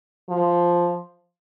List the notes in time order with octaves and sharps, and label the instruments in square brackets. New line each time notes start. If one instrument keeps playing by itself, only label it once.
[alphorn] F3